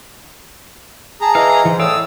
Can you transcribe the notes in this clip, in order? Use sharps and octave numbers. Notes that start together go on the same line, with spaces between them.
G#4 A5 A#5
E3 D#5 F5
G#2 E3
A2 D5 F5 D#6 E6